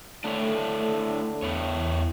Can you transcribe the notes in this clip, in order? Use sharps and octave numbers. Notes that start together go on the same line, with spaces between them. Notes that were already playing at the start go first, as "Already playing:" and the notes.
D3 A3 D4 E4 C#5
E2 B3 E4 C#5